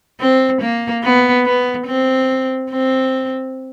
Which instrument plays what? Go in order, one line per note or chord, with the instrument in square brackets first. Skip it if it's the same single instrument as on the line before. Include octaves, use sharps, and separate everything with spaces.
[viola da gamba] C4
A#3
B3
B3
C4
C4